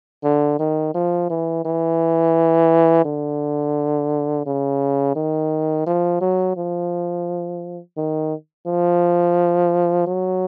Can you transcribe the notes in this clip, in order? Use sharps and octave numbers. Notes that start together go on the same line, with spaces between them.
D3
D#3
F3
E3
E3
D3
C#3
D#3
F3
F#3
F3
D#3
F3
F#3